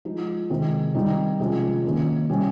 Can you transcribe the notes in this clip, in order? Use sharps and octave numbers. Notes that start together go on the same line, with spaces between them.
F3 G#3 D#4
C3 D#3 G#3 C4
D#3 G3 C4 D#4
C3 F3 G#3 C#4
D#3 A#3 C#4
C3 G3 A#3 C#4